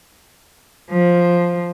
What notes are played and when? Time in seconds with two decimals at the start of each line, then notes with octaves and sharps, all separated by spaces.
0.91 F3